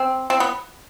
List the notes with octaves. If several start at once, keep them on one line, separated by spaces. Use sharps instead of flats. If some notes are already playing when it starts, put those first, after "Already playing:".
Already playing: C4
C4
B3